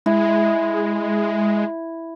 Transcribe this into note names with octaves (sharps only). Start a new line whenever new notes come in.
G#3 E4